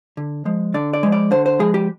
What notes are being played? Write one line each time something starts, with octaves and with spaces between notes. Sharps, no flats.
D3
F3 G#3
D3 D5
D5
F3 G#3
D5
D3 C5
C5
F3 G#3 G#4
G4